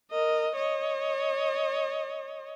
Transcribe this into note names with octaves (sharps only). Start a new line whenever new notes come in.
A#4 D#5
C#5 D#5